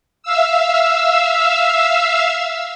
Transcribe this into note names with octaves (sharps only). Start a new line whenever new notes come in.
E5 F5 E6